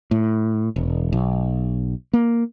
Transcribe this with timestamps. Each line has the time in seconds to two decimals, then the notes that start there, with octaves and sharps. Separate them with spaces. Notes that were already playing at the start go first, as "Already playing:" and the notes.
0.11 A2
0.76 E1
1.13 B1
2.13 A#3